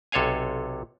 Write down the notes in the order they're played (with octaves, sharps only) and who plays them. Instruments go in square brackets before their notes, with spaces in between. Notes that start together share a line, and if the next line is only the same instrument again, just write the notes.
[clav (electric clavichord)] B1 C3 A4 C#5 F5 G#5